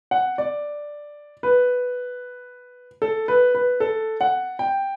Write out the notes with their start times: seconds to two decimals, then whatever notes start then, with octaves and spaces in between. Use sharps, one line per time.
0.11 F#5
0.38 D5
1.43 B4
3.02 A4
3.28 B4
3.55 B4
3.80 A4
4.21 F#5
4.59 G5